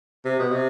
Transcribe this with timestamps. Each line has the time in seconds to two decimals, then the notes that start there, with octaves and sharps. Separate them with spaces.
0.25 C3
0.39 B2
0.52 C3